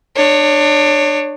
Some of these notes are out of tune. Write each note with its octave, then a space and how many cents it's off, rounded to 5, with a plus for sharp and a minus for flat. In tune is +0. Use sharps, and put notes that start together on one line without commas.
D4 +30 C#5 +0